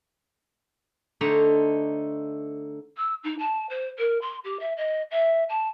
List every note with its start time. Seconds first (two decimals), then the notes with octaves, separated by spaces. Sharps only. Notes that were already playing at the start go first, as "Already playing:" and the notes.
1.21 D3 A3 D#4 A4 C5 A#5
2.97 E6
3.24 D#4
3.39 A5
3.70 C5
3.98 A#4
4.21 C6
4.44 G4
4.60 E5
4.77 D#5
5.11 E5
5.49 A5